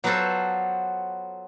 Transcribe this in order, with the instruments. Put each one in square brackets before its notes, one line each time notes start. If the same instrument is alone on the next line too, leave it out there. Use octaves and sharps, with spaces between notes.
[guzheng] F#3 B3 F4 F#4 A4 C5